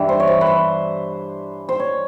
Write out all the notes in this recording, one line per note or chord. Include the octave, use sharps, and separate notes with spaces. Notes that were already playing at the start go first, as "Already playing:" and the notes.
Already playing: G2 E3
C5
C#5
C5
B4
C5
C5
C#5